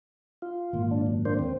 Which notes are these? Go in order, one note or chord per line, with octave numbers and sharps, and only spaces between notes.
F4
G#1 A#2
D4
F#2
A#3 D4 C5
D#2 C4